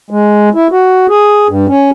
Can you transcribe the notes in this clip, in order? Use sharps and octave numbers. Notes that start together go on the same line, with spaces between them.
G#3
E4
F#4
G#4
G2
C#4